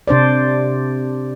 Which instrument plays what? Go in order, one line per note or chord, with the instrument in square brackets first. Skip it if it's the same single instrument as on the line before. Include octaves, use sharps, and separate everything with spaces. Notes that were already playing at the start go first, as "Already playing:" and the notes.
[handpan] C3 D4 C5 D5